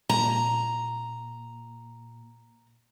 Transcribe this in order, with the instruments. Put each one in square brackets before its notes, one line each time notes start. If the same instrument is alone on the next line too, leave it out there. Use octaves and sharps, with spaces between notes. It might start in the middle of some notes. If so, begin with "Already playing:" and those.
[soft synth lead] A#2 [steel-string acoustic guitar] A#5